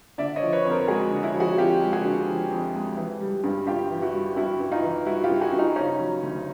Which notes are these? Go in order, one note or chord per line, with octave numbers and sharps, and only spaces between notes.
D3 D5 E5
C#5 D#5
F3
B4 C#5
F2
A#4 C5
G#3 F#4 G#4
D3
E4 F#4
F3
F#4 G#4
F2 F4 G4
G#3
F#4 G#4
D3
F3
F2
G#3
E3
G3
G2
G2 F4 G4
E3
E4 F#4
G3
G2 E4 F#4
G2
D#4 F4
E3
G3 E4 F#4
F4 G4
G2
F#4 G#4
G2
D#4 F4
C#3 C#4 D#4
F#3
D2